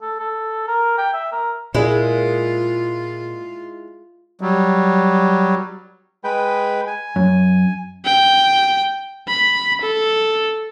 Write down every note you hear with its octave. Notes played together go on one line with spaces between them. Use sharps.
A4
A4
A#4
G5
E5
A#4
A#2 G#3 E4 F4
F#3 G3
G#3 B4 G5
G#5
F#2
G5
B5
A4